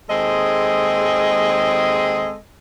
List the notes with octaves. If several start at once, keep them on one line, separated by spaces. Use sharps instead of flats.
D#2 G#3 C4 G#4 A4 D#5